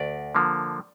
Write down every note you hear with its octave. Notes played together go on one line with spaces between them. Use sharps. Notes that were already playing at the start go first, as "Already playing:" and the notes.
Already playing: D2 D5
D3 F3 A#3